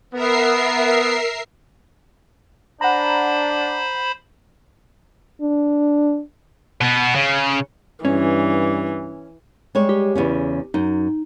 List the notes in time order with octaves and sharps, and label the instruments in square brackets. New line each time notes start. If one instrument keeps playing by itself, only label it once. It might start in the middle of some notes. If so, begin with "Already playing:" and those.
[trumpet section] B3 [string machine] A#4 E5 C7
[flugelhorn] D4 [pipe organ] C5 B5 [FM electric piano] F#5 A#5
[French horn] D4
[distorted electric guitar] B2 B3
C#3
[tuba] G2 [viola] E3 [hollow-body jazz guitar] C#4
[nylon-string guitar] G3 G#3 C#5
[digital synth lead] G4
[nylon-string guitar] E2 C#3 C#4
[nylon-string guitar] F#2 [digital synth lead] D#4